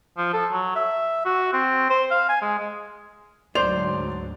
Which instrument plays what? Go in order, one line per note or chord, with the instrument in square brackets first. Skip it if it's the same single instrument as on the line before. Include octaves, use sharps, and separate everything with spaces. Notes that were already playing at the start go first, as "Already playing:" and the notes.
[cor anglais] F3
A4
F#3
E5
F#4
C4
C5
F5
G#5
G#3
G#3
[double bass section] D2 G#2 F#3 [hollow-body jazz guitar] C5 [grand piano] D5 F7